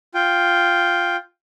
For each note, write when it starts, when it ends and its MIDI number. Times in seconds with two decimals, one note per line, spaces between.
0.14 1.16 65
0.14 1.16 79